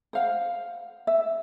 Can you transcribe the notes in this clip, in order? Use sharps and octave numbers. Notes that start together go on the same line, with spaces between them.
C5 F5 F#5
E5